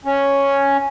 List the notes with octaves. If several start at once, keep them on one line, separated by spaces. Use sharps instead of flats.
C#4